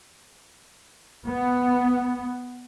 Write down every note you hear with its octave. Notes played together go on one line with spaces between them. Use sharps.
B3